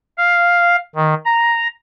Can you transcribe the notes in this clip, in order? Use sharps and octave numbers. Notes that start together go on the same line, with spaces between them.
F5
D#3
A#5